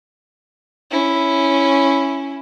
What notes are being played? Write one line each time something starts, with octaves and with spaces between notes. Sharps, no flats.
C#4 E4